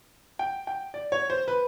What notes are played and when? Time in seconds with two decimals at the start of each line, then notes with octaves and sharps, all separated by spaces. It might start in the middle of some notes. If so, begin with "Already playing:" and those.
0.39 G5
0.67 G5
0.94 D5
1.12 C#5
1.30 C5
1.48 B4